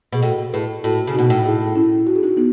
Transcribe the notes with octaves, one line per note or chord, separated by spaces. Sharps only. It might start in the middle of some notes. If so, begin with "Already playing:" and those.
B2 G#4
A2 F#4 A4
A2 G#4 B4
A2 F#4 A4
C#3
B2 D#4 F#4
A2
E4 G#4
C#4 E4
F#4
G#4
D#4 F#4
B3 D#4